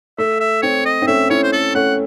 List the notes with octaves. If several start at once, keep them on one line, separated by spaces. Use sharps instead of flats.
A3 E5
E5
C4 C#5
D#5
C4
A3 C#4 E5
C#4 E4 C#5
C5
A4
A3 C#4 F#5